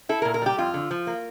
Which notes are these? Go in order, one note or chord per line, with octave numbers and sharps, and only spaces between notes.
E4 A4
A#2 A#4
A#4
G3 G4
F2 F4
D3
F3
A#3